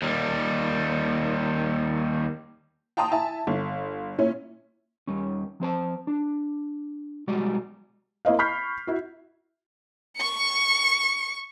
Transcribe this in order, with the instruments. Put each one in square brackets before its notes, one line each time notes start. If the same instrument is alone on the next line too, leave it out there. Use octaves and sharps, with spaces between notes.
[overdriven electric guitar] D#2 G3
[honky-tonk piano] G5 A5 A#5 C6 D#6
E4 E5 G#5 A5
G1
A#2 C#4 E4
[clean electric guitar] D#2 G3 C#4
F3 C4 C5 A5
D4
B1 G3 G#3 F#4 D5
[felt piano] A#3 E4 C5 D#5 F5
B5 C#6 F6 G6 B6 C7
E4 F#4
[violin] C#6 C#7